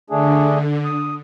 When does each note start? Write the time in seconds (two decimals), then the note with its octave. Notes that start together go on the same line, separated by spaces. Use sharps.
0.10 D3 A3 D4 G#4
0.85 D#6